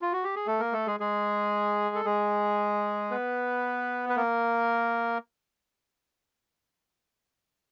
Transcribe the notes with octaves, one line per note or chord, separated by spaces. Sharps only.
F4
F#4
G4
G#4
A3 A4
A#3 A#4
A3 A4
G#3 G#4
G#3 G#4
A4
G#3 G#4
B3 B4
B4
A#3 A#4